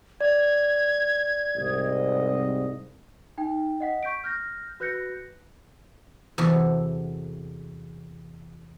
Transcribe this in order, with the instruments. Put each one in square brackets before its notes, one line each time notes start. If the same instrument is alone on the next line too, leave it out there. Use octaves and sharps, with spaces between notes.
[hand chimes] D5 [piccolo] G#6
[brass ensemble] C2 G#2 D#5
[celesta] D#4 G5
D#5 F#5 B6
C#6 G6 B6 D7
F6 G6 A#6
F#4 B4 F#6 G6 A#6 C#7
[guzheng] E2 C3 F#4 A4 E5